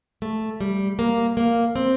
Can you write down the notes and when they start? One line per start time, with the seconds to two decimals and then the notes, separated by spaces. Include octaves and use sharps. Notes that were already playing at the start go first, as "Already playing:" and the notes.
0.22 A3
0.61 G3
0.99 A#3
1.37 A#3
1.76 C4